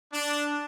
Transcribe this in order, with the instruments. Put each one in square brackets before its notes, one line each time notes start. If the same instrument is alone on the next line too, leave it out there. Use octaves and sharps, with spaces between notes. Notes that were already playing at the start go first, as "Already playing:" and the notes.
[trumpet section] D4